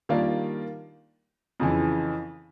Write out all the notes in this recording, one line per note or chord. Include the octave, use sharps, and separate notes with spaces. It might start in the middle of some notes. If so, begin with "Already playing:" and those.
D#3 G3 A#3 D4 F4
F2 C#3 E3